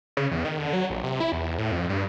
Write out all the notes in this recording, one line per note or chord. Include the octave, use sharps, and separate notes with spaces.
C#3
E2
D#3
D3
F#3
A#1
C3
E4
E2
A2
F2
G2